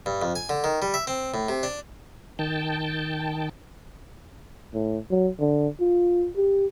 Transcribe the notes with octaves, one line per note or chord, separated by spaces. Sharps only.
G2
F2
G#5
D3
D#3
G3
E5
C4
A2
C3
D4
D#3 G5 A5
A2
F#3
D3
F4
G4